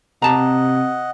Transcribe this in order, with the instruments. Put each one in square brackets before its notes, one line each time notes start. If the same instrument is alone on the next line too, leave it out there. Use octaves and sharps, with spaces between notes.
[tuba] C3 [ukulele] G4 A5 A#5 [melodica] D#5 F#5